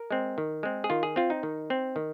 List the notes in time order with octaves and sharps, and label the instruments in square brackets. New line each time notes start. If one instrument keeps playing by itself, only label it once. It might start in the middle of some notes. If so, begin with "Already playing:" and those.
Already playing: [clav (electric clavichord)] A#4
G#3 C4
D#3
G#3 C4
G#4
D#3 F4
G#4
C4 F4
D#4
D#3
C4
D#3